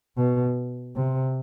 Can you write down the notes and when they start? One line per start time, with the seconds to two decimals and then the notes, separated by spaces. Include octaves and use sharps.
0.17 B2
0.96 C3